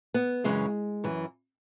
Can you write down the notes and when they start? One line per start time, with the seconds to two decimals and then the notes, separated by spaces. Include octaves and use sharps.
0.14 B3
0.44 F#2 C#3 E3 G#3
1.04 F#2 E3